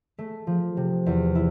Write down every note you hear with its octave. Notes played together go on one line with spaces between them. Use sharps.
A3
F3
C3
E2
E4